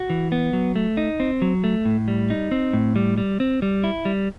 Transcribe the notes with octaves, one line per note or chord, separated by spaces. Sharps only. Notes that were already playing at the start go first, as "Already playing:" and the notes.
Already playing: F#4
E3
B3
F#3
A3
D#4
C4
F#3
A3
A2
G3
D#4
C4
A2
G3
G3
C4
G3
E4
G3